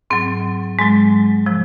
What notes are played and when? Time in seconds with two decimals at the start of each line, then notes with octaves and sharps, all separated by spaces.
0.10 G#2 F#3 C4
0.79 G#2 F#3 G#3
1.46 C3 F3